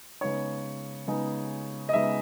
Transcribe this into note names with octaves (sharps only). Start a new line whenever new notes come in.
C#3 G#3 B3 D#4 C#5
C#3 G#3 B3 D#4
D#5
C#3 G#3 B3 D#4 E5